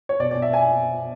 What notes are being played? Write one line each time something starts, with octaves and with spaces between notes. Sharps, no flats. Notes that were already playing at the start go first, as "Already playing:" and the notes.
C#5
B2 D5
D5
B2
E5
B3 G#5